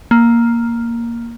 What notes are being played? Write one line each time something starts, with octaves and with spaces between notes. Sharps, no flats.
A#3